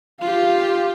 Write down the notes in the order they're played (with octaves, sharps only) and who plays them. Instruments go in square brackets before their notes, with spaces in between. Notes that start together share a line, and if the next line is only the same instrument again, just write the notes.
[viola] F4 G4 [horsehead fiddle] F5